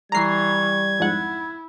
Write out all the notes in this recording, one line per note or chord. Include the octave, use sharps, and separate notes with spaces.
E3 G3 A#5 C#6 G#6 C7
F2 G#2 E4 F#5